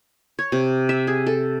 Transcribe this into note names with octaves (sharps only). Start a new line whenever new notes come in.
C#5
C3
E5
G#4
A4